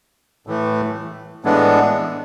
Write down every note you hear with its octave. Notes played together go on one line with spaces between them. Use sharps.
A2 E3 A3
A2 E3 G#3 B3 D4